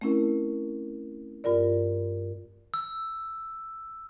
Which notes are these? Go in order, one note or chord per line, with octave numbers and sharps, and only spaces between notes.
A3 C4 C#4 E4 A#4
G2 F4 A#4 D5
E6